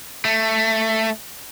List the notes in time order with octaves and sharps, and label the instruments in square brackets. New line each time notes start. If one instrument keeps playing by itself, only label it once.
[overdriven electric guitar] A3